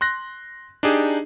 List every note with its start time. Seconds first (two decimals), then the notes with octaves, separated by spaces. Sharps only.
0.01 C6 F#6 A#6
0.83 D4 D#4 G4 G#4